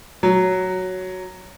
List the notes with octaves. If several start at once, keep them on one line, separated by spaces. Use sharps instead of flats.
F#3